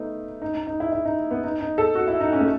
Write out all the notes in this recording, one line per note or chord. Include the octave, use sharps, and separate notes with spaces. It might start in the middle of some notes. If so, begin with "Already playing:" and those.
Already playing: A3 B3 D#4
D#4
D#4
D#4
E4
E4
D#4
B3
D#4
D#4
A4
F#4
E4
D#4
C#4
A3